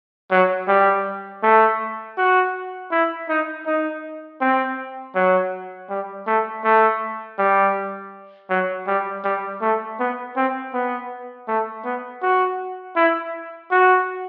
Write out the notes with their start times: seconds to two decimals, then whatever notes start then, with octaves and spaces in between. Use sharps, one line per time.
0.31 F#3
0.68 G3
1.43 A3
2.17 F#4
2.91 E4
3.29 D#4
3.66 D#4
4.41 C4
5.15 F#3
5.89 G3
6.27 A3
6.64 A3
7.39 G3
8.50 F#3
8.87 G3
9.24 G3
9.62 A3
9.99 B3
10.36 C4
10.74 B3
11.48 A3
11.85 B3
12.22 F#4
12.96 E4
13.71 F#4